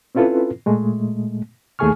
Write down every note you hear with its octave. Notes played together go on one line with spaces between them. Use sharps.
C4 C#4 E4 F4 A4 B4
A#2 G#3 A3
D#2 A3 G#4 G#5 C#6 F6